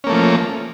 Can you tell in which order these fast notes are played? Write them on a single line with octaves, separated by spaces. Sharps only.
C#4 A#3 A3 F3